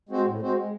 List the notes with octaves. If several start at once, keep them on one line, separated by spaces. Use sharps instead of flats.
G#3 C4 F#4 C5
A2
G#3 C4 F#4 C5
G#3